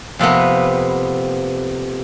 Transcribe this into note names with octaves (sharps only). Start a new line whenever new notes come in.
F2 C3 A#3 B3